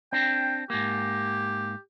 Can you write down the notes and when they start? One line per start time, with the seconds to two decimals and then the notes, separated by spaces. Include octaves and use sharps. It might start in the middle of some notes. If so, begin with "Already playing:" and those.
0.13 C4 D4 G5
0.70 G#2 A#3 G4